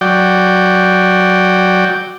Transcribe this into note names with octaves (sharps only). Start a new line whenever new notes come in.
F#3 D5 G5